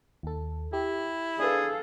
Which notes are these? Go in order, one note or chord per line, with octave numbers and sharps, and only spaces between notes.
D#2 A4
E4 G4
D4 G#4 A4 B4 F5